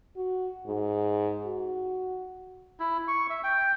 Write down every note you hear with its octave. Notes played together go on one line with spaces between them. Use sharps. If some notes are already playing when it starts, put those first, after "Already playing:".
F#4
G#2
F#4
E4
C#6
E5
G5